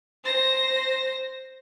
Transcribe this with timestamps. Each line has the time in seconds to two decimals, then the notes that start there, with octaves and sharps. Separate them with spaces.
0.25 C5 A#6